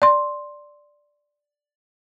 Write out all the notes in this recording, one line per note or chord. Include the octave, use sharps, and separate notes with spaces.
D5 C6